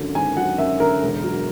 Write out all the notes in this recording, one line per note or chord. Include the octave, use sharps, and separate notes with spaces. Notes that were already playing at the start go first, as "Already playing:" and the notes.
Already playing: G#1 F#2 D3 F#3
G#1 G#5
F#3 F#5
F#2 E5
D3 A#4
E1
F#3